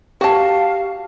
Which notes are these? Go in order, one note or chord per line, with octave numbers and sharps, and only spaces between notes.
F#4 G4 F5 A5